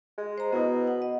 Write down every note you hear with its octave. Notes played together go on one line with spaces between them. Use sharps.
G#3
C5 A#5
B2 B3 E4 D#6
F#5
D#5